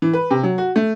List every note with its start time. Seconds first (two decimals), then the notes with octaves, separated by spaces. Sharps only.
0.02 E3
0.13 B4
0.31 C3
0.43 F#3
0.58 F#4
0.76 A3